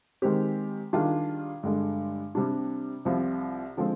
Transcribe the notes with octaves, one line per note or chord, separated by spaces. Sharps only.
D#3 G#3 C4 G4
D#3 G3 D4 F4 G#4
G2 D3 G#3
C3 G3 D4
C2 C3 F3
D3 F3 G#3 C4